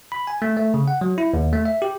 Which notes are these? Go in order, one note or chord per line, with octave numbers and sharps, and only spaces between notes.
B5
G#5
A3
A3
C#3
F#5
F#3
E4
D#2
A3
E5
G4